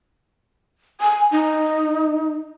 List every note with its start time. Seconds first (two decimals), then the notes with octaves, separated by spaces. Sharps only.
1.01 G#5
1.32 D#4